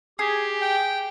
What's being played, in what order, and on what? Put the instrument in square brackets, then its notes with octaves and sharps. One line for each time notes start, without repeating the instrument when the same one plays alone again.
[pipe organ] G4 [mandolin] G#4
[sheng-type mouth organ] G5